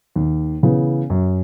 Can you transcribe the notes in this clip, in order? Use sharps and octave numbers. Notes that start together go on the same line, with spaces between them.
D#2
C#3 E3 B3
F#2